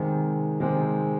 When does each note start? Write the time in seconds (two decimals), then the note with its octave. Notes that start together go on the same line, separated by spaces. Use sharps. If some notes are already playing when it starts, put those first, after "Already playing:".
Already playing: C3 D#3 G#3 C4
0.60 C3 D#3 G#3 C4